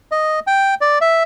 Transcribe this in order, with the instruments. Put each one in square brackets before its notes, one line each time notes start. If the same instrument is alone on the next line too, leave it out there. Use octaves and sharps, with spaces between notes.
[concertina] D#5
G5
D5
E5